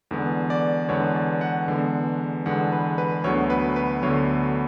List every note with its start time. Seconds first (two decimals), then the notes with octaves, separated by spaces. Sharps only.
0.11 E2 D3 G#3 B3
0.50 D5
0.89 E2 D3 G#3 B3 C#5
1.15 D5
1.41 F#5
1.68 E2 D3 G#3 B3
2.46 E2 D3 G#3 B3 F#5
2.72 B4
2.98 B4
3.24 D2 D3 F#3 B3 C#5
3.50 B4
3.76 B4
4.02 D2 D3 F#3 B3 C#5